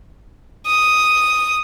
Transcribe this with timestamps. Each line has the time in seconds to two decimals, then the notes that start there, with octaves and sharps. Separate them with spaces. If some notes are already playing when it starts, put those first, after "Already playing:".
0.68 D#6